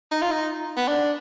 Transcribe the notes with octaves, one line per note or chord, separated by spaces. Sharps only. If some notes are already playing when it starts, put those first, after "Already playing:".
D#4
F4
D#4
B3
D4